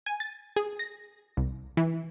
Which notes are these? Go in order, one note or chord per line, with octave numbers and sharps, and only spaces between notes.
G#5
A6
G#4
A#6
C2
E3